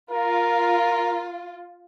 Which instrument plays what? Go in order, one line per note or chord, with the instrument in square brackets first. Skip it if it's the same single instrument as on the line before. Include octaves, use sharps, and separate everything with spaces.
[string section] F4 [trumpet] A#4